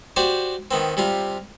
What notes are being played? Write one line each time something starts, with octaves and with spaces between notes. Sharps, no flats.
F#4 G4 C5 D5
D#3 B3 C4
C3 G3 F4